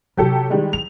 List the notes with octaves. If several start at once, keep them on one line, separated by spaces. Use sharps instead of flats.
C3 F#3 F4 G4 A4
D#3 G3 G#3
E3 F#3 F7